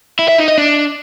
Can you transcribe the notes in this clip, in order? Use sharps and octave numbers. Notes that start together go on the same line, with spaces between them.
E4
E5
D#4
D#5
D4